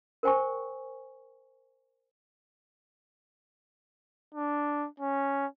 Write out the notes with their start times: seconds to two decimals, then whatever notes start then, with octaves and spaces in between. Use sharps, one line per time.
0.23 A#4 C5 G5 G#5 C#6
4.34 D4
5.00 C#4